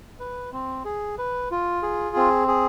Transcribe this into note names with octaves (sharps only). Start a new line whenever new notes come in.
B4
C4
G#4
B4
F4
G#4
C4
G#4